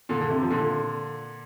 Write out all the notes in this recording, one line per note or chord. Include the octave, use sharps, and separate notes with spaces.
A#2 D3
D3
C3
F3
A#2 D3